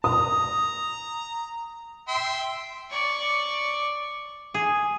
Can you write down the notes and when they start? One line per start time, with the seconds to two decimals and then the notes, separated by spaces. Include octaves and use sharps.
0.04 A#5 D#6
2.08 E5 G5 C6
2.91 D5 C#6
4.54 G#4